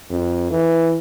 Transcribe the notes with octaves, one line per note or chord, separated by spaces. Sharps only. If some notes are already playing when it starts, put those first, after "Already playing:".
F2
E3